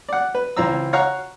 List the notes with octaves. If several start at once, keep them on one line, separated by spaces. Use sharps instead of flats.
D5 F#5
B4
C#2 E3 C4 A#5 E6
C#5 F5 F#5 A#5 C#6